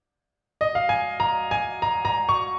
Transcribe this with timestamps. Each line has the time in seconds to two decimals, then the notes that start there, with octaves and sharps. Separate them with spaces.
0.61 D#5
0.75 F5
0.89 G#5
1.20 A#5
1.51 G#5
1.82 A#5
2.05 A#5
2.29 C#6